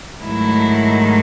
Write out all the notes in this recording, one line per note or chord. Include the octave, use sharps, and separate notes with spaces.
G#2 D#3 F#3 A3 E4